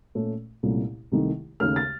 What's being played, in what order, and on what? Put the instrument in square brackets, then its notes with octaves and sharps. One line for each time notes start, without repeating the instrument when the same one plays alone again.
[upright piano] A#2 A3 C#4
C2 A#2 A3 C#4
C2 C3 D#3 A3
D#2 C#3 A3 F6
A6